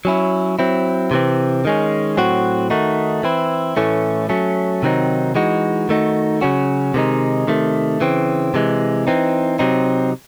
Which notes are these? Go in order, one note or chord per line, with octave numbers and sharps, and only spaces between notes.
F#3 C#4 E4
F#3 C4 E4
C3 E3 C4
D#3 G#3 C#4
A2 F#3 C4 F#4
D#3 A3 D#4 F#4
E3 C4 E4
A2 E3 A3 C#4
F#3 A3 C#4
C3 D#3 F#3 C4 D#4
E3 G#3 D#4 F#4
D#3 A3 D#4 F#4
C#3 F#3 C#4 F#4
C3 D#3 G#3 D#4
C3 D#3 A3
C#3 E3 C4
C3 E3 G#3
E3 C4 D#4
C3 F#3 C4 D#4